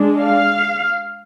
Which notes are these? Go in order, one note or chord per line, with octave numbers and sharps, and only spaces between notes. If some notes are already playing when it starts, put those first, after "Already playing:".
Already playing: G#3 D4
F5